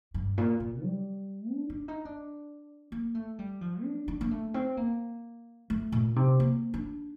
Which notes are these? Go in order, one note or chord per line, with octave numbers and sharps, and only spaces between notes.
G2
A#2
A#2
G3
D4
D4
D#4
D4
A#3
A3
G3
F3
D4
D4
A#3
A3
C4
A#3
A3
A#2
C3
A#3
D4